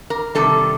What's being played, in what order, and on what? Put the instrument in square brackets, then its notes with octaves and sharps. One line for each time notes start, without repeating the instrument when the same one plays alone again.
[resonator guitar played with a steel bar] A#4
C3 D#3 G3 A4